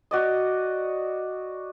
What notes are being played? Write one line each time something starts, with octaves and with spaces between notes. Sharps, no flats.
F#4 D5 D#5